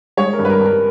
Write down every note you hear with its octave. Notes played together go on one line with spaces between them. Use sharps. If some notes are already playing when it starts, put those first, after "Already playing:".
G#3 C#5
A#4
G2
B4
A#4
G2
A#4